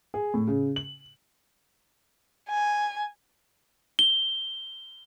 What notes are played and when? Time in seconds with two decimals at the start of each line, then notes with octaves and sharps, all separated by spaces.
0.14 G#4
0.34 A2
0.47 C#3
0.76 F#7
2.50 G#5
3.99 G7